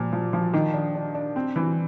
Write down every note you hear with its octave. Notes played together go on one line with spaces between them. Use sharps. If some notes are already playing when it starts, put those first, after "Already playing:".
Already playing: A#2 F3
F3
F3
D#3
D4
D4
D4
C4
E3